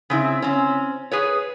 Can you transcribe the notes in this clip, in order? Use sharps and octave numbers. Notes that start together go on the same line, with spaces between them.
C#3 C4 E4
C4 C#4
G#4 B4 C#5